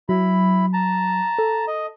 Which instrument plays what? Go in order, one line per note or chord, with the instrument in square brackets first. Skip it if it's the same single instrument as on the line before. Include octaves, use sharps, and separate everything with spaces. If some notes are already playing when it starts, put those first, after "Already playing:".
[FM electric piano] F#3 [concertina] E4 B5
[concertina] A5 A#5
[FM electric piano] A4
[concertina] D#5